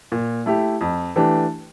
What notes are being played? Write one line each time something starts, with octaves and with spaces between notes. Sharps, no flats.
A#2
A3 E4 G4
F2
E3 A3 D4 G4